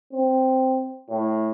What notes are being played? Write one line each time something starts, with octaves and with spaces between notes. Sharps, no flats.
C4
A2